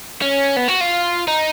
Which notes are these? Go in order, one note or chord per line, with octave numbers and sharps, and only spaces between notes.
C#4
B3
F#4
F4
D#4